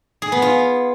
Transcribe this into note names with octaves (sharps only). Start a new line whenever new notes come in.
G#4
B3
F4